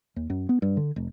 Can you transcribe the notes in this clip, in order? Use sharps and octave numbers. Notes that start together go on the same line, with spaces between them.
D#2
F#2
B3
G2
D3
F1